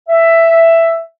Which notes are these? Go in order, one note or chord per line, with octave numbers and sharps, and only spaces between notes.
E5